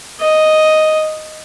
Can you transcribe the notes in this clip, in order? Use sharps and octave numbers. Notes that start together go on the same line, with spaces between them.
D#5